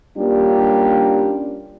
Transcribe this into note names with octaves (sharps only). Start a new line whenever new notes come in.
G3 A#3 C#4 D4 F4 G4